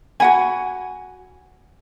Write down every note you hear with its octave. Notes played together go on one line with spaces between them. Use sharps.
F#4 F#5 G#5 B5